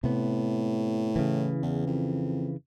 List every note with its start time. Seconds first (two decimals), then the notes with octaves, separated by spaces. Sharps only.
0.04 A2 C3 B3
1.16 C#3 E3
1.63 E2
1.87 F2